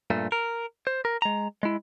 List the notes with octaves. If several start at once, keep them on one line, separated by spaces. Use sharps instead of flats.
G2 A#2 A3
A#4
C5
A#4
G#3 A#5
G#3 E4